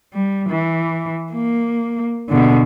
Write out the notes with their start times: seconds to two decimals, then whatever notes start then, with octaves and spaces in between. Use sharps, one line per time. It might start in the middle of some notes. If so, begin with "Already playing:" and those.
0.14 G3
0.49 E3
1.33 A#3
2.29 B2 D3